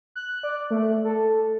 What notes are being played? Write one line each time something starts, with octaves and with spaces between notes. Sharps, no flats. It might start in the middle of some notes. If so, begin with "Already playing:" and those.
F#6
D5
A3
A4